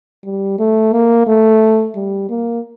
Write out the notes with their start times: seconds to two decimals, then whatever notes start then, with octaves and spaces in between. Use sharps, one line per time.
0.24 G3
0.59 A3
0.93 A#3
1.27 A3
1.96 G3
2.29 A#3